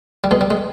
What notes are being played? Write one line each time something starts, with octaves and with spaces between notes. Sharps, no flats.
G3
B2 G#3
G3
G#3